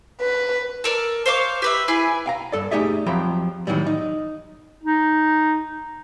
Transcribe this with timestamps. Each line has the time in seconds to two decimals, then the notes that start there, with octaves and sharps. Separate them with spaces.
0.20 B4
0.84 A4 A#4 D5
1.26 C5 C#5 F5 D6
1.62 G4 B4 E5
1.88 E4 G#4 B4 G#5
2.26 F5 G5 A#5
2.52 G2 A4 D5
2.71 A3 D#4 G4 G#4 D5 E5
3.06 F2 F3 F#3 G4 A#5 B5
3.67 A2 D#3 E3 F#3 G3
3.86 D#4
4.83 D#4